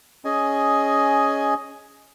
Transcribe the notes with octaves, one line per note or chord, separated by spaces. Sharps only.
C#4 G#4 D#5 G#5